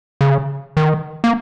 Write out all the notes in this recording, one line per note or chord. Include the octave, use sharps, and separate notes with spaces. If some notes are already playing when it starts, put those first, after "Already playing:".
C#3
D#3
A#3